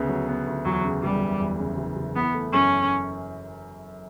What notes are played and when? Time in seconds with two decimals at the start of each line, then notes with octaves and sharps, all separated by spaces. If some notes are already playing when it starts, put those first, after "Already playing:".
Already playing: D2 C#3 B3
0.09 F#3
0.29 B3
0.47 D2
0.65 E2 F#3
0.84 C#3
1.03 F#1 G3
1.22 F#1
1.40 E2
1.59 C#3
1.77 F#1
1.96 F#1
2.15 E3 B3
2.34 A3
2.53 F#2 C#4